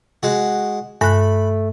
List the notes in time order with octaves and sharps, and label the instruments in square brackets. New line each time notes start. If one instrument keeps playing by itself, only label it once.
[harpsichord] G#3 F#4
[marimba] G2 F#6 [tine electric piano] A3 [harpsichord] B5